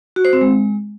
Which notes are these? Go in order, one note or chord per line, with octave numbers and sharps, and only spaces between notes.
F#4
C5
C4
G#3